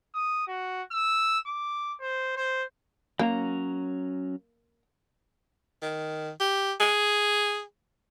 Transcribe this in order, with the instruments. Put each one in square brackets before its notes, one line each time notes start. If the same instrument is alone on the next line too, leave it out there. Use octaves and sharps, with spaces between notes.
[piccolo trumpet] D#6
F#4
E6
D6
C5
C5
[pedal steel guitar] F#3 C#4 A#5 [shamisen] A#3
[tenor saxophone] D#3
G4
G#4